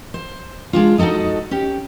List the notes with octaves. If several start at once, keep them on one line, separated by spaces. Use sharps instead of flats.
C5
G#3 D4 F4
D#4 F#4 G#4 A4 D#5
C#4 G4